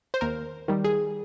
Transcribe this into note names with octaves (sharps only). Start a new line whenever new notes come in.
C5
D#2 A#4
D#3 G3
G#4